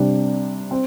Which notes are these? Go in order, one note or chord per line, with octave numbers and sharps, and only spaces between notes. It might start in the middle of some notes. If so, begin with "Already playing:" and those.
Already playing: C3 G3 D4
C4